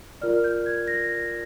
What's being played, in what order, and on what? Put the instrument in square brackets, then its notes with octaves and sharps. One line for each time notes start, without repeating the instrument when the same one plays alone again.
[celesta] F4 A#4 D5 F6
G6
G#6
A#6